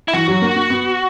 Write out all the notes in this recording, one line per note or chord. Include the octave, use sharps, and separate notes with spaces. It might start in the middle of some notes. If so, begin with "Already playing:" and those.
E4
E3 F#4
F#3
A#3
A#3
B3